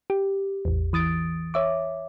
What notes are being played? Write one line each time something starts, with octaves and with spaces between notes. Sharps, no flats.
G4
A1 E2
E3 D#6 A6 D7
C#5 E5 D6